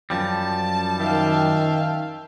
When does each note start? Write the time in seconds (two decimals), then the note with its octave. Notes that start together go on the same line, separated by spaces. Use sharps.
0.10 F#2 F3 G3 A5
0.99 D#3 E5 F5 G5